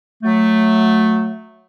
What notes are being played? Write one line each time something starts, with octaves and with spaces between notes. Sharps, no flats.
F#3 A3